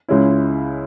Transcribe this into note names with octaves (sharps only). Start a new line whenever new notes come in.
C#2 C#3 G#3 C#4 E4